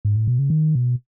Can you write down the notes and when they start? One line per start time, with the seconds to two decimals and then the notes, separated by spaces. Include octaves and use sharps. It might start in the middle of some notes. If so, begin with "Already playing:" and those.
0.05 G#2
0.16 A2
0.27 B2
0.39 C#3
0.50 D#3
0.75 B2